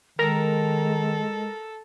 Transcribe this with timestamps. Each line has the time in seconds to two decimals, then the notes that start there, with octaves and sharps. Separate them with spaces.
0.19 D#3 G#3 A4 A#4 A#5